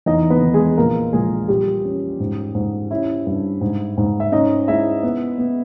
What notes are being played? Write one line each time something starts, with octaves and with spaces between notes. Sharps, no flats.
E2 D#4 D#5
B3 B4
D#3
G#3 G#4
A#1 A#3 A#4
A#1 G#3 G#4
A#1 G3 G4
C#4
G#2
G#2
C#4 E4
G2
G#2
G#2
E5
C#4 D#4 D#5
G#3 E4 E5
B3
B3